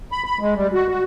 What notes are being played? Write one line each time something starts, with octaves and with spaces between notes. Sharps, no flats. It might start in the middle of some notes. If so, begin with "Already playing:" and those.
B5
B5
G#3
G3
F#4
F#4